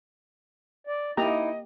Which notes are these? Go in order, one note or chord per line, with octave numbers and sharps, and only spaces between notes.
D5
A#3 D#4 E4 G4 D#5 A#5